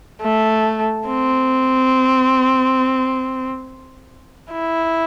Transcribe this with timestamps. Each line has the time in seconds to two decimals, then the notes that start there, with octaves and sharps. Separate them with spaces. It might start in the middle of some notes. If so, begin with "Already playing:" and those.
0.22 A3
1.08 C4
4.53 E4